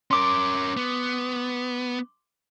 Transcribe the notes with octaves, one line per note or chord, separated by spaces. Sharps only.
C#4 A#4 C6 D6
B3